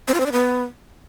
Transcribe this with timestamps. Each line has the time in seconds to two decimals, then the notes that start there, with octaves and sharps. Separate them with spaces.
0.08 C4
0.14 F4
0.20 C4
0.26 D4
0.32 B3